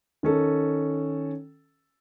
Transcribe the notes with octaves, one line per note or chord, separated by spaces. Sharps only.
D#3 C#4 A4